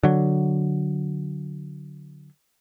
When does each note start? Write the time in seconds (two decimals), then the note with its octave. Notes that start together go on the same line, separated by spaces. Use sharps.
0.03 D3 F#3